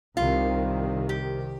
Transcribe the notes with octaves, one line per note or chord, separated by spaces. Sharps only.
C2 C3 D#3 F4
G4